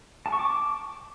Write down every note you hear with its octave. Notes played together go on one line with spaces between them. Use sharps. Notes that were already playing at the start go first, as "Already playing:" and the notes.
A5
C#6
D6